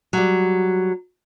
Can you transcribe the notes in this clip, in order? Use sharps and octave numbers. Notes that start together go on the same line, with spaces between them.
F#3 G3